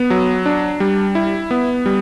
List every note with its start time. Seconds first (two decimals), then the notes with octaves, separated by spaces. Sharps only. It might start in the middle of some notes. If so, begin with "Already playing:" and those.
Already playing: B3
0.10 F#3
0.46 D4
0.80 G3
1.15 E4
1.51 B3
1.86 G3